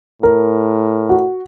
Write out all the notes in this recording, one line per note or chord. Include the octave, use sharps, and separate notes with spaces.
A2 A#4
F#4